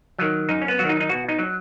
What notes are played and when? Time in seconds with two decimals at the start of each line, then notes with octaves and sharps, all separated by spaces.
0.19 D#3 F#3
0.49 F#2 D#4
0.62 C#4
0.68 B3
0.79 D#3 F#3 F#4
0.89 D#4
1.00 D#4
1.09 B2 F#4
1.28 D#4
1.39 F#3